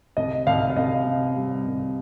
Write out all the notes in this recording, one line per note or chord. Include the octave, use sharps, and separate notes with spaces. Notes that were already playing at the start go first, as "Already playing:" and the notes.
C2 D#5
C2 F5
F5
C2 D#5
C3
G3
C2